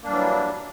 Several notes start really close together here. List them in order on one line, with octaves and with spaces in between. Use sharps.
A#3 D4 G3 E3 F#3